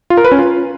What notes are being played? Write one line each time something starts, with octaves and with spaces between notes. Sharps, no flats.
F4
A#4
B4
C#4
F4